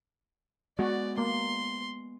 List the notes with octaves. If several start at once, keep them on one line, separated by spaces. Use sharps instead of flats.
G#3 B3 F#4 D5
A#3 C6